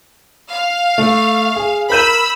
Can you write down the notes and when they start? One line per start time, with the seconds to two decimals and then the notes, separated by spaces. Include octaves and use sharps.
0.51 F5
0.98 A3
1.56 G#4
1.90 A#4 B5 E6 G6 D#7